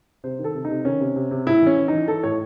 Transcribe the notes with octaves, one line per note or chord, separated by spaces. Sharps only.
C3 C5
D#3
A4
C3
D#4
C3
D#3 C#4
C3
C3
C3
A2 E4
E3 C#4
E3
E3 D#4
E3 A4
A2 C#5